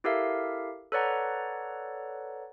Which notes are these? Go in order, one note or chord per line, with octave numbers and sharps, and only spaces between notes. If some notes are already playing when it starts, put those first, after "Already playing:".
E4 G4 A4 A#4 E5 F5
A4 B4 C#5 D5 F#5 A#5